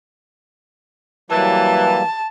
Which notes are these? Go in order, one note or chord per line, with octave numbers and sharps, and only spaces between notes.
E3 F#3 G3 A#3 A5